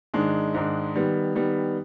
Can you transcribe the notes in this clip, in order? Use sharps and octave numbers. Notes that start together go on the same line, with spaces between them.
G#2 D#3 G#3 D4
G#2 D#3 G#3 D4
D#3 G3 B3
D#3 G3 B3